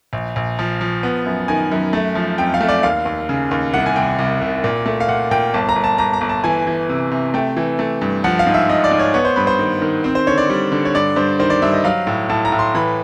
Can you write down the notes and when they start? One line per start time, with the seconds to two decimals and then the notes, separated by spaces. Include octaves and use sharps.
0.13 A#1
0.36 A#1
0.59 F3
0.81 F3
1.03 B3
1.26 F#2
1.48 D#3 G#5
1.71 F#2
1.93 A3
2.15 F3
2.38 F2 G5
2.54 F5
2.61 A3
2.68 D5
2.83 D#2 F5
3.05 D#2
3.29 C#3
3.51 D#2
3.73 C2 F#5
3.86 G#5
3.96 C2 G5
4.19 C2
4.41 C2
4.64 A#2
4.86 A3
5.00 F5
5.09 A#2 F#5
5.31 A#2 G5
5.54 G1 A5
5.69 A#5
5.76 G1
5.84 A5
5.98 G1 A#5
6.13 A#5
6.21 G1
6.29 A5
6.44 E3 G#5
6.67 E3
6.89 C3
7.11 C3
7.34 A3 G5
7.57 E3
7.79 A3
8.01 G2
8.24 F3 F#5
8.39 F5
8.47 G#2
8.54 E5
8.69 G#2 D#5
8.84 D5
8.91 G#2
9.00 C#5
9.14 B3 C#5
9.25 C5
9.36 G2 B4
9.47 C5
9.59 D#3
9.82 D#3
10.04 C4
10.15 C5
10.27 D3 C#5
10.37 D5
10.49 G3
10.72 D3
10.85 C#5
10.94 G2 D5
11.16 G2 C5
11.39 D#3 C5
11.50 D5
11.62 G2 E5
11.73 D#5
11.84 F#3 F5
12.07 A2
12.29 A2 A5
12.45 A#5
12.52 A2
12.59 C6
12.74 E3 B5